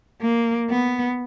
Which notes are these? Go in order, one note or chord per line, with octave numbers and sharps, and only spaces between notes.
A#3
B3